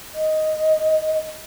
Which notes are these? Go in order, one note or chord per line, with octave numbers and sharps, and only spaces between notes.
D#5